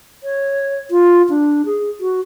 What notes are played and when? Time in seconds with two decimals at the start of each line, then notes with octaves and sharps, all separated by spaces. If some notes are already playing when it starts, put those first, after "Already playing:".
0.23 C#5
0.91 F4
1.30 D4
1.66 G#4
2.00 F#4